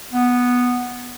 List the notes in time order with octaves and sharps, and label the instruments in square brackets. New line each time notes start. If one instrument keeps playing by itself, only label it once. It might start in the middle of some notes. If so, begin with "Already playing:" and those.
[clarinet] B3